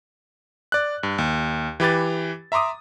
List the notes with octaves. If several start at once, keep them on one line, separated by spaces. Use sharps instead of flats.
D5 F#6
G2
D#2
E3 G4 B4 A6
E5 A#5 C6 D6 D#6